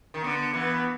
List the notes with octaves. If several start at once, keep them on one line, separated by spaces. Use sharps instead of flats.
D#3
D3 B3
E3 B3